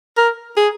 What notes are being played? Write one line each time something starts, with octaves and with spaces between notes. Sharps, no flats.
A#4
G#4